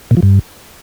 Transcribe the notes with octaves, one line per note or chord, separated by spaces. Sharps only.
A#2
F3
G2